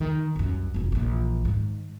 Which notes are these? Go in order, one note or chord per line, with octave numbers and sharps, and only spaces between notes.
D#3
C2 F#2
F1 B1
A#1 E3
G#2 D#3